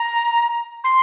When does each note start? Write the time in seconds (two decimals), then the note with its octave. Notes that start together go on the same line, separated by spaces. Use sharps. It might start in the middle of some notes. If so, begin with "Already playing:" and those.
Already playing: A#5
0.84 C6